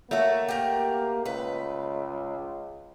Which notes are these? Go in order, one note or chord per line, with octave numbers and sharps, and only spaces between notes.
A3 A#3 F#4 C#5 E5
G4 A#4
C#2 B4